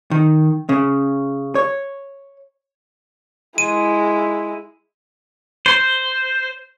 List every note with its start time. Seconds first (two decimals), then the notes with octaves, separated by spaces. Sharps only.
0.11 D#3
0.69 C#3
1.55 C#5
3.58 G#3 E4 D#7
5.66 C5